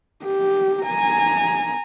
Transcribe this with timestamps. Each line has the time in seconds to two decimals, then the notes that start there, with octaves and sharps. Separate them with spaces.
0.24 G4
0.83 G#5 A#5